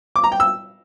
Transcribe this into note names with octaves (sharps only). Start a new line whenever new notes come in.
D6
A#5
G5
E6